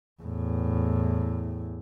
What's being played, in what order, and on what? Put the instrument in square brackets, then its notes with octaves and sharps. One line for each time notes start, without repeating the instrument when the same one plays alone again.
[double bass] E2 A2